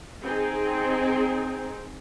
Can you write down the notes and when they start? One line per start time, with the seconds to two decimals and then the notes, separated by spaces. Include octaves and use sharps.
0.23 C4 D#4 G#4